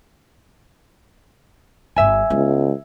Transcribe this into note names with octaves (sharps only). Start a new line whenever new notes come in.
D1 G1 E5 G#5
C#2 G#3 B3